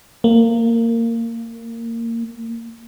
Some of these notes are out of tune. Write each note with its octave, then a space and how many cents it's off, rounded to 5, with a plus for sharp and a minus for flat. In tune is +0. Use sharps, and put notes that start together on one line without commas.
A#3 -20